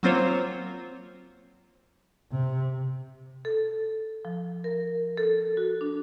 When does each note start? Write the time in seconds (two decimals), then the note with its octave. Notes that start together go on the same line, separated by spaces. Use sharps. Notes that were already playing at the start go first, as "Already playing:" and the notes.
0.03 F#3 A#3 C4 F4 C5 C#5
2.31 C3
3.45 A4
4.25 F3
4.64 A#4
5.17 A4
5.57 F#4
5.81 D4